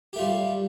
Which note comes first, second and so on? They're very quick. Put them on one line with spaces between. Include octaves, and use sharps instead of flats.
G4 A3 F4 G3